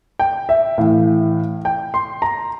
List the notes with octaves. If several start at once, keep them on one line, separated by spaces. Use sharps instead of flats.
G5
E5
A2 E3 F5
G5
C6
A#5